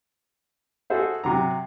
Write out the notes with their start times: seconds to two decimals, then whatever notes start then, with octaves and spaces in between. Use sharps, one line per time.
0.90 F#4 G#4 A4 C5 E5
1.24 C3 F#3 A#5